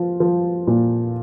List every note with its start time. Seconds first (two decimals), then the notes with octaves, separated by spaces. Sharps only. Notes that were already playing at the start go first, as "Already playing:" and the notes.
Already playing: F3
0.20 F3
0.67 A#2